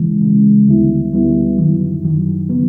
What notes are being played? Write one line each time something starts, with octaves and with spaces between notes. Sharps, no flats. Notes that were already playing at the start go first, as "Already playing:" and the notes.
Already playing: C#3 E3 G#3
C#3 E3 G#3
D2 D3 G3 B3 E4
D2 D3 G3 B3 E4
F#2 D#3 F#3
F#2 D#3 F#3
C#3 F#3 B3